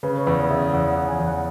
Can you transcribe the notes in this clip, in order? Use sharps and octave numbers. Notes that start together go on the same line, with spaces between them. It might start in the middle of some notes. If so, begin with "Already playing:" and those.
C#3 B4
C#5
E2 B4
C#3 E5
E2 F#5
F#5
E2
G#5
E2
F#5